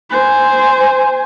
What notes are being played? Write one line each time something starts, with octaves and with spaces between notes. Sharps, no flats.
C5 G#5